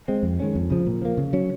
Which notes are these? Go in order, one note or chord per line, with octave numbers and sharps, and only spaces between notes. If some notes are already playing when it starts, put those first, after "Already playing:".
G#3 C4
F2
D#3 G#3 C#4
F2
C#3 F3
A#2
F3 A#3
C#3
F#3 C#4